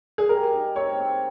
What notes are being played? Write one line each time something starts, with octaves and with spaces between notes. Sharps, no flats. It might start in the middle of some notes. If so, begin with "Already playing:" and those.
G#4
G3 A#4
D#4
C4 C#5
C4